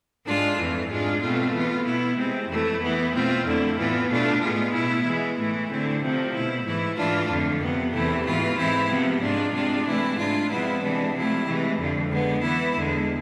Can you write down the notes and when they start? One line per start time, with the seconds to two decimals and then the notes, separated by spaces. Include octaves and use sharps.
0.24 G#2 G#3 D4 F4
0.56 F2 E3 A3
0.88 G#2 G#3 D4 F4
1.21 B2 A3 C4 F4
1.54 E3 B3 F4
1.85 B2 B3 E4
2.17 C3 G#3 C4
2.49 F2 E3 A3 E4
2.81 E3 B3 E4
3.13 B2 A3 C4 F4
3.45 F2 D3 A3 E4
3.78 A2 E3 B3 F4
4.09 B2 A3 D4 F4
4.41 A2 G#3 B3 F4
4.73 B2 B3 E4
5.05 E3 G#3 B3
5.37 A2 E3 A3 E4
5.69 D3 A3 C4 E4
6.02 C3 F3 A3 C4
6.34 B2 A3 E4
6.65 G#2 E3 A3 E4
6.97 G#2 E3 A3 D4 F4
7.29 F2 D3 F3
7.61 C3 F3 B3
7.93 E2 C3 E3 A3 E4
8.25 G#2 E3 B3 F4
8.58 G#2 E3 G#3 C4 E4
8.90 C3 F3 B3
9.21 G#2 G#3 D4 F4
9.53 C3 G#3 D4 F4
9.86 C3 E3 A3 E4
10.18 G#2 G#3 D4 F4
10.50 C3 F3 G#3 B3 E4
10.81 C3 E3 G#3 D4
11.14 C3 F3 A3 E4
11.46 C3 E3 G#3
11.78 F2 D3 F3
12.10 D3 G#3 B3
12.42 E3 B3 E4
12.74 E2 D3 G#3